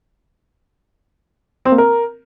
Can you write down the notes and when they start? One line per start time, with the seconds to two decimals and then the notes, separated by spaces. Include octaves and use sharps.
1.65 C4
1.72 A#3
1.78 A#4